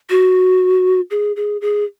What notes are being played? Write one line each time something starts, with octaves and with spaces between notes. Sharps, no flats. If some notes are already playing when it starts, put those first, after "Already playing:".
F#4
G#4
G#4
G#4